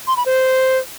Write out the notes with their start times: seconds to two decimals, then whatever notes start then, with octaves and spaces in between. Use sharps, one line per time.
0.08 C6
0.17 B5
0.26 C5